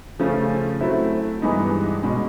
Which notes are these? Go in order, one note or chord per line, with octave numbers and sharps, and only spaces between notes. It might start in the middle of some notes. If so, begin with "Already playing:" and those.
C#3 F3 A3 C#4
F#3 A3 C4 E4
G2 E3 G#3 B3 D#4
B2 G#3 C#4